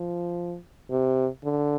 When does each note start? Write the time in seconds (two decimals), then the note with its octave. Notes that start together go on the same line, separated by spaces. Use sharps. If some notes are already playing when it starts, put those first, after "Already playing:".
Already playing: F3
0.90 C3
1.44 D3